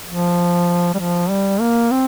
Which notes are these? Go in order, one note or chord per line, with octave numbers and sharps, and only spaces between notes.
F3
G3
F3
G3
A#3
C4